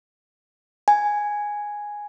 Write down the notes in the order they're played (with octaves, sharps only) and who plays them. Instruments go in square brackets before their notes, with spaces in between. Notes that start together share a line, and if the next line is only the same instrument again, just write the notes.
[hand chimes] G#5